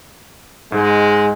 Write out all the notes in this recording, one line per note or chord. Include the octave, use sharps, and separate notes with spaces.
G#2 G#3